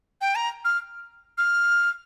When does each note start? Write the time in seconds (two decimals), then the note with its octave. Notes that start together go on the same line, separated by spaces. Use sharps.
0.21 G5
0.35 A#5
0.65 F6
1.38 F6